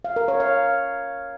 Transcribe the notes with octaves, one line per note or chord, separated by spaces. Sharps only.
F5
A#4
C#5
F5